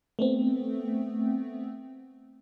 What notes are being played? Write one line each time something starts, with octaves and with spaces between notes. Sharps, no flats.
A3 B3 C4